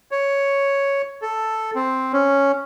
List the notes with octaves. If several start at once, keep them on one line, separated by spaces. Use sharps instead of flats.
C#5
A4
C4
C#4